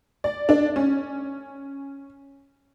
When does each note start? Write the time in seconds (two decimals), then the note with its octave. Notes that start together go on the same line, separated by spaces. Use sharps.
0.24 D5
0.49 D4
0.76 C#4